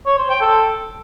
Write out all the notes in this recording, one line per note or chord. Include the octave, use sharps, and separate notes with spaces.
C#5
C5
G5
A4